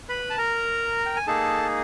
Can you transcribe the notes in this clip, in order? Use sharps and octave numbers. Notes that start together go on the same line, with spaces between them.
B4 B5
A5
A#4 A#5
G5
G#5
A#3 D#4 G#4 A4 A5